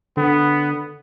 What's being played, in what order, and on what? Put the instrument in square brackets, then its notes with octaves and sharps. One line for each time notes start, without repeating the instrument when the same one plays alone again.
[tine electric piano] D3 [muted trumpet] B3